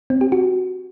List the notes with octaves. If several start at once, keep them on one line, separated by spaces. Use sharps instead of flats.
C4
G4
F#4